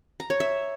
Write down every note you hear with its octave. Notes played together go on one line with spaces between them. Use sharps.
A#5
C#5
E5